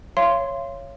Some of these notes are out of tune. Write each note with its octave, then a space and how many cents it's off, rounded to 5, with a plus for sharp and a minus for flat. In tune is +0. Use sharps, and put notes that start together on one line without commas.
C#5 -5 F5 -35 C6 +0